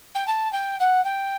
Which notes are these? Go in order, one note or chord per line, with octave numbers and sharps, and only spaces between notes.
G5
A5
G5
F#5
G5